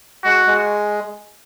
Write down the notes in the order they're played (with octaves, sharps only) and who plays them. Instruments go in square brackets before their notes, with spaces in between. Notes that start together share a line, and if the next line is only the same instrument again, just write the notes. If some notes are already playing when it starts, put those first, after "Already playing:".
[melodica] G#3 [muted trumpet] F#4
[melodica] G#3